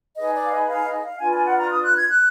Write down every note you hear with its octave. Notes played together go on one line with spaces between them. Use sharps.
D#4 G#4 B4 D#5
D5
F5
D#5
F5
D#5
F5
D4 F4 B4 G#5
G#5
F#5
A#5
D#6
F#6
G#6
F#6